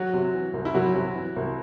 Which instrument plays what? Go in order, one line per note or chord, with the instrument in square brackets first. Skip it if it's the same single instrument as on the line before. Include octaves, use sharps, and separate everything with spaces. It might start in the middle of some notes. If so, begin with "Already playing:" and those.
Already playing: [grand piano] F#3 F#4
[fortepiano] C3
E3
C2
[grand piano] E4
[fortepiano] C2 [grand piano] F#3 F#4
[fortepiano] C3
E3
C2